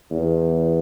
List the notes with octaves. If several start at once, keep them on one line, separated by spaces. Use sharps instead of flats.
E2